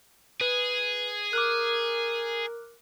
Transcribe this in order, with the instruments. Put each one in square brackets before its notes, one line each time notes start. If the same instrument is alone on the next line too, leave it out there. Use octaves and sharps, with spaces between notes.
[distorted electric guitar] G#4 [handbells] B4
[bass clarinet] A#4 [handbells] D6 F6 F#6